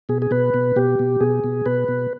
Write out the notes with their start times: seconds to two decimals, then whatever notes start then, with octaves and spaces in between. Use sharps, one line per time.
0.09 B2 G#4
0.22 G#4
0.31 B2 B4
0.54 B2
0.76 B2 G4
0.99 B2
1.20 B2 G#4
1.44 B2
1.66 B2 B4
1.88 B2